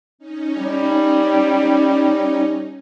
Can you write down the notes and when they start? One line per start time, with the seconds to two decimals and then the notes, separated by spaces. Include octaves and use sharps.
0.19 C#4 D#4
0.58 G3